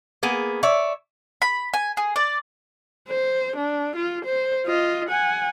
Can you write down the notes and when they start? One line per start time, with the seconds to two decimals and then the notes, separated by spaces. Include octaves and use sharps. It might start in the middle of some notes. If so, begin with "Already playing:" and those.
0.23 A#3 B3 G#4
0.63 C#5 D5 E5
1.42 B5
1.74 G#5
1.97 G#4
2.16 D5
3.09 C5
3.56 D4
3.96 F4
4.25 C5
4.66 F4 D#5
5.09 F#5 G#5